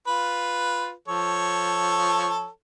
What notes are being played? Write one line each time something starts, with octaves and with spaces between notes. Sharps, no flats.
F4 B4
F3 A4 C#5